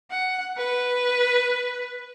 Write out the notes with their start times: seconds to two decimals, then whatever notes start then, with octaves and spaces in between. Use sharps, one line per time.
0.11 F#5
0.57 B4